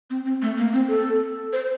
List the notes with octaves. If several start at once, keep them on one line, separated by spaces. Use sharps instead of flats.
C4
C4
A3
A#3
C4
A4
C5